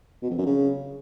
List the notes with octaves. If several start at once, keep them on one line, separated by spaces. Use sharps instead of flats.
B2
F2
F#2
C#3